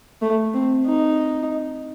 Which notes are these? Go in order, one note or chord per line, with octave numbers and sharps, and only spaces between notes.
A3
C4
D#4